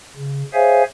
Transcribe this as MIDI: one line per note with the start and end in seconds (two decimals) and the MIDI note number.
0.16 0.43 49
0.54 0.83 68
0.54 0.83 72
0.54 0.83 73
0.54 0.83 76
0.54 0.83 77
0.54 0.83 80